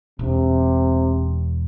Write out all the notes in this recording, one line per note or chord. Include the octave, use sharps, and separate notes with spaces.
E1 C3